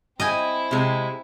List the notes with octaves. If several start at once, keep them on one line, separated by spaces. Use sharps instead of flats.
C4 E4 D#5 G5 G#5
C3 G#3